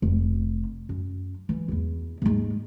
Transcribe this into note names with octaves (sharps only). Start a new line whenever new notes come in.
F1
F#2
E3
E2 E4
D#2 G#2